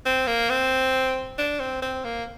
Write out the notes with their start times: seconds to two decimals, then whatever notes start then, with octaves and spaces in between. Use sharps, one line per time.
0.06 C4
0.27 A#3
0.50 C4
1.38 D4
1.60 C4
1.82 C4
2.04 A#3